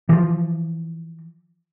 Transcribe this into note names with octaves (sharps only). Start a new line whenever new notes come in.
E3 F3